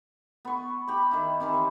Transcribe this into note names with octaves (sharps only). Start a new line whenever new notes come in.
B3 C#6
G4 B5
D#3 E4
C3 D#3 E3
C#5